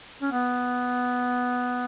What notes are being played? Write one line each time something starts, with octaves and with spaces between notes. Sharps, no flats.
C#4
B3